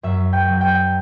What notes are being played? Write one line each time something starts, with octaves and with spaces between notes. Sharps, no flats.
F#2 E5
G5
F#3
G5